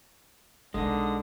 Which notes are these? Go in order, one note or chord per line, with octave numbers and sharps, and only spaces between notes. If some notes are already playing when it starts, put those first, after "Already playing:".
B1 D3 G#3 A#3 D#4 D#6